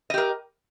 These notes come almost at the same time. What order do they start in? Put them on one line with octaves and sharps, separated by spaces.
D#5 G4 A#4